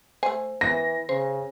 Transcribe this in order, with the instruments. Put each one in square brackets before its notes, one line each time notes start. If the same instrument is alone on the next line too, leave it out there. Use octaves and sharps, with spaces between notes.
[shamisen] A3 G#5 [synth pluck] C5
[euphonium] E3 [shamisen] B3 [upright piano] A#6
[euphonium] C#3 [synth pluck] C5